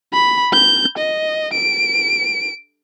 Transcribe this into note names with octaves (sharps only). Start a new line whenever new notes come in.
B5
G6
D#5
D7